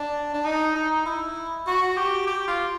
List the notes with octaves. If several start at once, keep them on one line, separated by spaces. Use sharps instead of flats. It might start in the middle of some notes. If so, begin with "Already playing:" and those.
Already playing: D4
D4
D#4
D#4
E4
F#4
G4
G4
F4